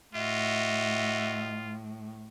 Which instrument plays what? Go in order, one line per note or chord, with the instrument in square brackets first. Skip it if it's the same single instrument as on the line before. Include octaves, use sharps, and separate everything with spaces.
[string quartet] A2 [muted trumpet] F4 [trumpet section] F#4 D#5 E5